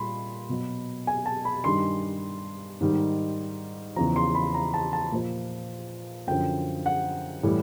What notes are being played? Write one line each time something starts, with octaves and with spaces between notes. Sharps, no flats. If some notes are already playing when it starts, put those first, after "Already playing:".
Already playing: A#2 G3 B5 C6
B2 F#3
G#5
A5
B5
G2 D#3 G3 C6
G#2 D#3 G3
E2 C#3 F3 A#5
C6
B5
A#5
A5
A5
A#2 F3
F#2 D3 F3 G5
F#5
A2 E3 G3